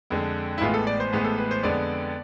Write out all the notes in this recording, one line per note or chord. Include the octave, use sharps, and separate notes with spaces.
F2 D3 G#3
E4
A1 A2 E3 G#3 B3 F4
A4
D5
C5
A1 A2 E3 G#3 B3
A4
B4
C5
F2 D3 G#3 B3 D5